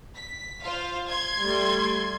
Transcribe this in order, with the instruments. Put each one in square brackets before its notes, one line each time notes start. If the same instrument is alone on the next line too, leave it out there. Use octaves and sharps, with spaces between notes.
[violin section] B6
F4 C5 F5
C6 G#6
[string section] G3 A3